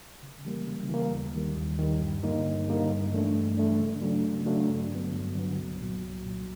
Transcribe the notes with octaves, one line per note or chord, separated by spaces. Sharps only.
C#3
E3 G3 A#3
C#3
E3 G3 A#3
D#2
D#3 G3
D#2
D#3 G3
G2
D3 G3 A#3 D#4
G2
D3 G3 A#3 D#4
G2
E3 A3 D4
G2
E3 A3 D4
C#3
F#3 A3 D4
C#3
F#3 A3 D4
G2
D3 F#3 B3
G2
D3 F#3 B3
C2
A#2 F#3
C2
A#2 F#3